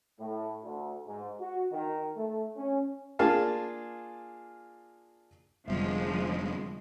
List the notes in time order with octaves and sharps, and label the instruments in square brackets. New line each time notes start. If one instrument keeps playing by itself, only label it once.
[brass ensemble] A2
D2
G#2
F#4
D#3
A3
C#4
[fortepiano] A#3 D4 F4 G#4 F5 A5
[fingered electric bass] F1 B3 [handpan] D3 G3 E5 [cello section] F3 G#3